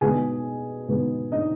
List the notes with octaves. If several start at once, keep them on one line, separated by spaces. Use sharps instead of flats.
B2 G#3 B3 D#4 G#4 G#5
B2 G#3 B3 D#4
D#4 D#5